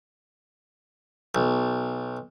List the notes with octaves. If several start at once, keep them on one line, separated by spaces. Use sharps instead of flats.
B1